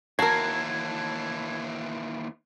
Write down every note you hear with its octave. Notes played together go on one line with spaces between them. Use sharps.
D#2 E3 F#4 A#4 A5 G#6 C7